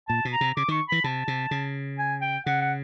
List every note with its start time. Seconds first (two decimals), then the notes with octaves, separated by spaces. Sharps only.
0.09 A#2 A5
0.25 B2
0.33 A#5
0.41 C3
0.57 C#3 D6
0.68 D#3 C#6
0.88 E3 B5
1.04 C3 A5
1.28 C3
1.51 C#3
1.98 G#5
2.21 G5
2.46 C#3 F#5
2.61 F#5